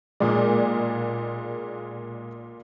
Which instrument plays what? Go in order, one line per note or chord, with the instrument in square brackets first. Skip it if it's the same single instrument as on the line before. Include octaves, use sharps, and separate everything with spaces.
[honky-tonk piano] B1 A#2 D5 [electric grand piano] G#3 A#3 G#4